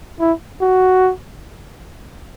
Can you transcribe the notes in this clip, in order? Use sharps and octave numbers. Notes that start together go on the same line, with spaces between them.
E4
F#4